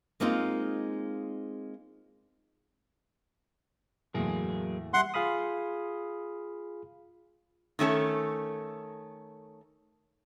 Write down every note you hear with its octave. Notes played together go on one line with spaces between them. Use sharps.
G#3 A#3 C4 D#4 F4
E2 A2 F#3 A#3 G#4
G3 E5 F#5 C6
F4 G#4 F5 B5 D#6
D#3 A3 C#4 A4